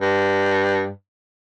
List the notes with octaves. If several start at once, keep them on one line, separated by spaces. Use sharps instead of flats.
G2